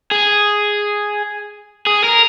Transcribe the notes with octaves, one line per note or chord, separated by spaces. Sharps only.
G#4
G#4
A#4